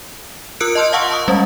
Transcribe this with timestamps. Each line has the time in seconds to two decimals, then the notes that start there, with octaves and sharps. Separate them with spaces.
0.60 F4 A#4 E6 F#6 C#7 D7
0.75 D#5 A5 C6 F6 G6
0.93 D#5 F5 F#5 A5 C#6 E6
1.11 A5 C#6 D#6
1.28 G3 G#3 C#4